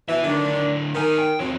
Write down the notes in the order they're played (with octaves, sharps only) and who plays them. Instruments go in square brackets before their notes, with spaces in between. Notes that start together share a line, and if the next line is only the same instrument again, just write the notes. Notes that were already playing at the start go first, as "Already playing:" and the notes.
[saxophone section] B2 E3 [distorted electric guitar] B4 E5
[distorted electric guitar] D3 F#3 [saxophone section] D#3 D4
[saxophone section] D#3 [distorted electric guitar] B3 G#5
[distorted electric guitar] G5
[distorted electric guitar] E2 C4 [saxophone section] F3 F#3